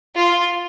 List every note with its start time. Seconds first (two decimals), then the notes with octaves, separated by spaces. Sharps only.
0.15 F4